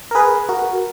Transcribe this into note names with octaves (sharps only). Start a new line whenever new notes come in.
A#4
G#4 B4
F#4 A#4